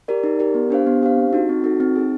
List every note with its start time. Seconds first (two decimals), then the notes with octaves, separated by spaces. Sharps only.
0.08 G4 A#4 D5
0.23 D#4
0.39 G4 A#4 D5
0.54 B3
0.70 D4 G4 C5 F5
0.86 B3
1.02 D4 G4 C5 F5
1.18 C4
1.33 D#4 F#4 A4
1.49 C4
1.64 D#4 F#4 A4
1.80 C4
1.96 D#4 G#4